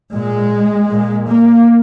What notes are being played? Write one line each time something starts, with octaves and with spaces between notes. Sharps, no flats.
A#2 G#3
A#2
A#3